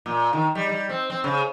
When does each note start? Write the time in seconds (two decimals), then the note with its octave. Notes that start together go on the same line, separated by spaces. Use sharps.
0.06 A#2
0.33 D#3
0.55 G3
0.69 G3
0.89 C4
1.10 C4
1.24 C#3